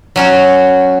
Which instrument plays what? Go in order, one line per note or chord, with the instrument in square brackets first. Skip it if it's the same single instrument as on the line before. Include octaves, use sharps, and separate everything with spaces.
[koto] F#3 C#4 F#4